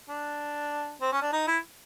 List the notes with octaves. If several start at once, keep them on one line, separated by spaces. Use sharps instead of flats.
D4
C4
C#4
D4
D#4
E4